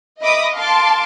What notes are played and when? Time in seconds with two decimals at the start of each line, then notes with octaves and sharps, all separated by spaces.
0.20 D#5 E5 B5 D6 D#6
0.56 F5 A5 C6 D6